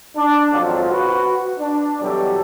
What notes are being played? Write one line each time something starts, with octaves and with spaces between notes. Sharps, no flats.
D4
G#1 F2 F3 F#3 C4 F4
F#4 B4
D4
B2 E3 F#3 G3 G4 A4